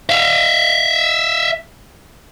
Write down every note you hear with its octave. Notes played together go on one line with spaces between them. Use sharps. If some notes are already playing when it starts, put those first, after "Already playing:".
E5 F5